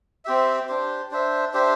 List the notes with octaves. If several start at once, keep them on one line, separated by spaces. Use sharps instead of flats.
C4 G4 E5
D4 G4 C5
D4 C5 E5
D4 G4 C5 E5